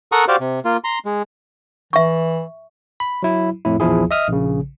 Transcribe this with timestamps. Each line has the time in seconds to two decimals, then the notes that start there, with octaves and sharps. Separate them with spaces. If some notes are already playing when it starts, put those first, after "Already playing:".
0.12 A4 A#4 F#5 A#5 C#6 D#6
0.28 F#4 G4 C5 D5 F5
0.40 C3
0.65 A#3 F4
0.84 A#5 C6
1.05 G#3
1.93 E3 E5 C#6
3.00 B5
3.23 F#3 E4
3.65 F2 A2 E4
3.80 A#1 E2 F3 E4 G#4
4.11 D#5 E5 D#6 F6
4.29 A#1 C#3